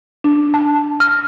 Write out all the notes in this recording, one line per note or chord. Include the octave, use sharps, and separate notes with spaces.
D4
A5
F6